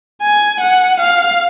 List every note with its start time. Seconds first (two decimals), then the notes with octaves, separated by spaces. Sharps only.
0.23 G#5
0.61 F#5
1.00 F5